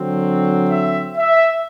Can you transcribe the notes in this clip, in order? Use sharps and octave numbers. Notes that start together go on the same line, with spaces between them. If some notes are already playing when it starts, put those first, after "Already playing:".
Already playing: D3 F#3 C4
E5
E5